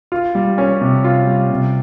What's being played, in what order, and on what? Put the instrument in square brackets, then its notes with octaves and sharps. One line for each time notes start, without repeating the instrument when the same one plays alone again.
[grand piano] F4
G3
C#4
C3
F4
G3
C3